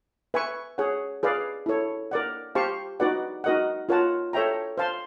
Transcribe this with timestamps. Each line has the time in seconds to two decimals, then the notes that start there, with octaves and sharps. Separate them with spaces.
0.34 B4 E5 G#5 C#6
0.78 G#4 C#5 F#5
1.23 G#4 B4 D5 F5
1.66 E4 A4 C#5
2.11 A#4 D5 F#5
2.55 G4 C5 F5 A5 C#6
3.00 D#4 F#4 B4 D5 F#5
3.44 D#4 F#4 A#4 D#5 F#5
3.89 F4 A#4 C#5 F#5 A5
4.33 A4 C#5 E5 G5 A#5
4.78 C5 F5 A5 C6